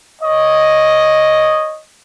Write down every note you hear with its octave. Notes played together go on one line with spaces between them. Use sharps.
C#5 D#5